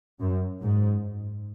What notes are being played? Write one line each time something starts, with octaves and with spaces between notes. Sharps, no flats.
F#2
G#2